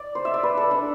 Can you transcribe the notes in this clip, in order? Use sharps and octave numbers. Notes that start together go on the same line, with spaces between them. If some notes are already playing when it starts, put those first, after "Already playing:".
Already playing: D5
C5
E5
D5
B4
A4
D4